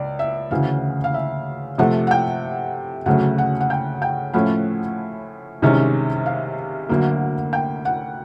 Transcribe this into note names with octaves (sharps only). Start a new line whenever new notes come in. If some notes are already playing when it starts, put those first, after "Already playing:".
Already playing: C#2 D5
E5
D2 C#3 E3 F5
F5
E5
C3 F3 A3 F#5
F#5
G5
D2 C#3 F#3 A3 F#5
F#5
F#5
G5
G5
A2 F3 A3 C#4 E4 F#5
C2 C3 D#3 G#3 C#4
F5
D2 D3 F#3 A#3
G5
F#5